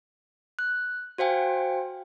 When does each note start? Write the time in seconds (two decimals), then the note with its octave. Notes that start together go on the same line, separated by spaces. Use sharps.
0.59 F#6
1.18 F#4 C5 F5 G5 G#5